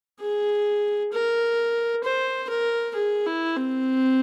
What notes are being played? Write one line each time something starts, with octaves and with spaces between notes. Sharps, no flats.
G#4
A#4
C5
A#4
G#4
E4
C4